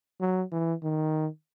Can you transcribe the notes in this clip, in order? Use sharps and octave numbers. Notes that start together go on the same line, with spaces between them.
F#3
E3
D#3